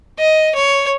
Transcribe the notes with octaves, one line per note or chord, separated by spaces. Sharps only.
D#5
C#5